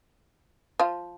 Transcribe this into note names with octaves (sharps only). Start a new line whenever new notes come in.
F3 F4